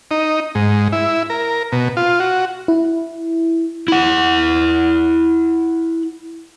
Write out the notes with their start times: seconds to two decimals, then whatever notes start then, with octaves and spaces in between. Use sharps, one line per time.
0.11 D#4
0.55 G#2
0.92 E4
1.30 A#4
1.72 B2
1.97 F4
2.20 F#4
2.68 E4
3.88 E4 F#5